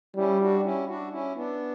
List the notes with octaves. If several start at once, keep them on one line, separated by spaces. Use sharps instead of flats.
G3 C#4 E4
D4 F#4
C#4 E4
D4 F#4
C#4 E4
B3 D4